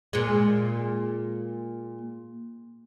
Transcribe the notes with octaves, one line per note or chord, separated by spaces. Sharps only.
A#2 G#3